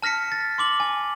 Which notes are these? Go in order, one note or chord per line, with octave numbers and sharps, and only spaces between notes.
A5 F6 A#6 B6 C#7
A6
C6 D6 F#7
G#5